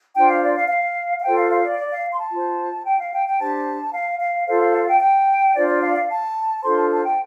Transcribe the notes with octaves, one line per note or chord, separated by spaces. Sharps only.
D4 F4 C5 G5
F5
D5
F5
F5
F5
F4 A4 C5 G5
F5
F5
D5
D5
F5
C6
A5
F4 C5
G5
F5
G5
G5
D4 G4 C5 A5
F5
F5
F4 A4 C5 F5
F5
F5
G5
G5
D4 F4 C5 D5
D5
F5
D5
F5
A5
D4 F4 A4 C5 C6
A5
A5
G5